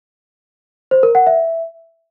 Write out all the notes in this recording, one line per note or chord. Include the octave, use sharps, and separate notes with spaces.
C5
A#4
F#5
E5